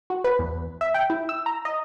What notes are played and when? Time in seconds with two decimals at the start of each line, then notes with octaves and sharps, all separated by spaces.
0.10 F#4
0.24 B4
0.39 E2
0.81 E5
0.94 G5
1.10 E4
1.29 E6
1.46 A#5
1.65 D#5